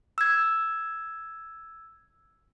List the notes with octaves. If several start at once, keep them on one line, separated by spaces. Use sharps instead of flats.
E6 G#6